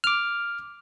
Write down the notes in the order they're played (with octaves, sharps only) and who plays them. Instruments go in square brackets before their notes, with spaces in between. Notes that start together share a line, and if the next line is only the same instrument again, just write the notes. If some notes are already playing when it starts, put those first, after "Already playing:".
[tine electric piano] D6 F6